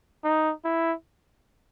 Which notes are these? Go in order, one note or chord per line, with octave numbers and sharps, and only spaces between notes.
D#4
E4